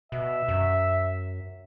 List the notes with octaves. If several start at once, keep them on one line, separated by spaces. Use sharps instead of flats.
B2 E5
F#2